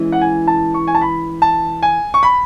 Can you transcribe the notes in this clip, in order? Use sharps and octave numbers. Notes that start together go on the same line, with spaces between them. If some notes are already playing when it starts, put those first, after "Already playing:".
Already playing: E3 G#3 C#4
F#5
G#5
A5
C#6
G#5
A5
B5
A5
G#5
C#6
B5